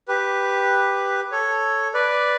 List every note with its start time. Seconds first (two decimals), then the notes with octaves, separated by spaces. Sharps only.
0.08 G4 B4
1.32 A4 C#5
1.94 B4 D5